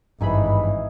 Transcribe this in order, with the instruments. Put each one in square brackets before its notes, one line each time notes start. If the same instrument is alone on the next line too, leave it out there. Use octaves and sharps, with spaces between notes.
[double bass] G#1 E3 [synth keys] G2 B5 [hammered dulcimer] D#4 G#4 E5